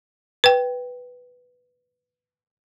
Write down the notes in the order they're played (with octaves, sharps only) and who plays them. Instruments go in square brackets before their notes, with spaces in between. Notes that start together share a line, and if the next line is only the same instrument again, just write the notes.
[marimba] B4 G5